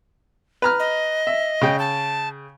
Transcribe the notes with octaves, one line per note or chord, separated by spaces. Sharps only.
B4 A#5 F6
D#5
E5
C#3 G5
A5